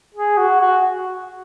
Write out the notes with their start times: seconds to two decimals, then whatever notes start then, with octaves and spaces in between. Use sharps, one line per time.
0.15 G#4
0.38 F#4
0.61 F#4